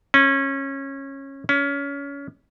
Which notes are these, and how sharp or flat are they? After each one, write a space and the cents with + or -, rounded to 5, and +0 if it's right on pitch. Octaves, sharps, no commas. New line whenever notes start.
C#4 -20
C#4 +25